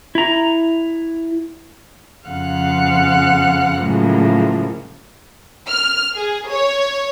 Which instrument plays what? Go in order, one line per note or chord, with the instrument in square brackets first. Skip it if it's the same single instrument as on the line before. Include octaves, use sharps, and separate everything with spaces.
[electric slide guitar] E4 A#5
[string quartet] F2 C#3 F5 F#5 F6 F#6
A2 C#3 F3 F#3 G#3 A#3
[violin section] F6
G#4
C#5